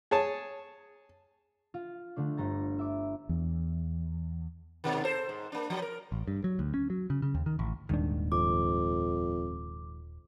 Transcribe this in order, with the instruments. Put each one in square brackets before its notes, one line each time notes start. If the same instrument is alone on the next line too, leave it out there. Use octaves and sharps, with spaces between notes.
[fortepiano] G#4 C#5 A5
[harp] F4
D3 A3 D4
G1 G3 A#5 A6
E5 D6
[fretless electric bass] E2
[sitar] G#2 B2 D#3
A4 C5
G#2
A#3 D4
F3 F#3
A#4
[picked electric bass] A1
G2
F#3
D2
C#4
F#3
C#3
C#3
D#2
D#3
A1
[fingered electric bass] D#1 D4 [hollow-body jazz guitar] G#2 D#3
[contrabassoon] F2 [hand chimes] D6